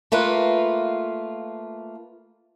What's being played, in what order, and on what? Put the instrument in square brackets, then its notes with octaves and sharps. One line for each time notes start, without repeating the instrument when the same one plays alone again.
[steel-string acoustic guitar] A3 A#3 F4 B4